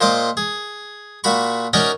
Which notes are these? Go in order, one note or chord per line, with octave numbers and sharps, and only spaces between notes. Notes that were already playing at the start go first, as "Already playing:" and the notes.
A#2 C5 D#5 D6
G#4
A#2 F#4 B5 C#6
C#4 D#4 F#4 A#4 D5 D#5